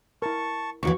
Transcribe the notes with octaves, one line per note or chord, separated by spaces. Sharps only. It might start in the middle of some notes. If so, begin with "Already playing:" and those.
E4 A#4 A5 C#6
D#2 D3 E3 F#4 C#6